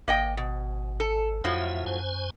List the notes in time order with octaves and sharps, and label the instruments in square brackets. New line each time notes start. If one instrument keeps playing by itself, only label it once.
[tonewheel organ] G#1 [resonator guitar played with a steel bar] A#3 D#5 G5
[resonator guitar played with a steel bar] B2
A4
[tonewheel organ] F2 E5 [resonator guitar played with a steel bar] A2 F3 F#3
[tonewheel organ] F#2 C5 G#5